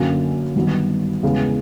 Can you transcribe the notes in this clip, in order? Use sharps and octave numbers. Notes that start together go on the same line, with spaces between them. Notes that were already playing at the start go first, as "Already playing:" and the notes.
Already playing: F#2 D3 F#3 A#3 C#4
G2 D#3 F#3 B3
E2 C#3 E3 G#3 B3